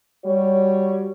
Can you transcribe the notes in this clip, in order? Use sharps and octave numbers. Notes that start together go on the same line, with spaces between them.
G3 F#4 C#5